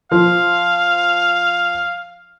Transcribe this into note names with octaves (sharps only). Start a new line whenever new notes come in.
F3 F5